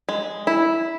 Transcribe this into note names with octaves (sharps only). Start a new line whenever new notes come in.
G#3
E4